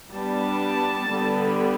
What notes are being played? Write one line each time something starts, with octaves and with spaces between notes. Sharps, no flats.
G3 B3 D4 A5
D3 G3 B3